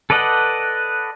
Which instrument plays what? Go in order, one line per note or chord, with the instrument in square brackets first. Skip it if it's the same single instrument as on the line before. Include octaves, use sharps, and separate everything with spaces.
[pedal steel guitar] A4 B4 D5 D#5 F#5